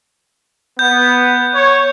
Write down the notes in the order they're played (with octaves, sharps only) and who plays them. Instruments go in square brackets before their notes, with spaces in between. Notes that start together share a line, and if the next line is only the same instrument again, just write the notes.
[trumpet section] B3 [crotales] G6
[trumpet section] C#5